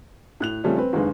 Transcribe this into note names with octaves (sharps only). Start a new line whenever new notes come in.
A2 F#6 F7
C#3 F3 G3 A3 C4 C#4
C4 B4
F#1 D#2 D3 G#3 B4